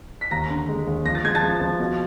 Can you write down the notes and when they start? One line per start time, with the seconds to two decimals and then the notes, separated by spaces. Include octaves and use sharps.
0.21 B6
0.31 D#2 A#5 A#6
0.50 D3
0.68 G#3
0.87 D#2
1.05 F3 A#6
1.15 A6
1.24 G#3 G#6
1.35 A5 A6
1.43 F3
1.61 F3
1.80 B2